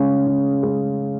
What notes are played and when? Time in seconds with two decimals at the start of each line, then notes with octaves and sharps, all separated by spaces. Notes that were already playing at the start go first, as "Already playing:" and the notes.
Already playing: C#3 G#3 C#4
0.27 C#3
0.63 G#3 C#4